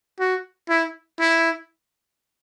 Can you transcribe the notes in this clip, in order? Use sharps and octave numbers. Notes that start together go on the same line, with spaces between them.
F#4
E4
E4